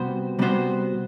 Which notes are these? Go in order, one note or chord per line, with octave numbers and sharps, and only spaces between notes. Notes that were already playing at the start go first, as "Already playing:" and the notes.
Already playing: C3 G3 B3 F#4 C5
C3 G3 B3 F#4 C5